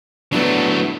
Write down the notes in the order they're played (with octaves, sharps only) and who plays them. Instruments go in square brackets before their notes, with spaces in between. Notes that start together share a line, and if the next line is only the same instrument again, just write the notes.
[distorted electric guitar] F#3 A3 [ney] B3 [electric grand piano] D4 E4